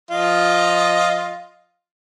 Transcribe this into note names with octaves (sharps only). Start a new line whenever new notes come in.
F3 F4 D#5